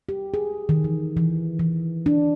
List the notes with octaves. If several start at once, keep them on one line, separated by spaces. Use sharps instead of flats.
G4
G#4
D#3
E3
E3
E3
D4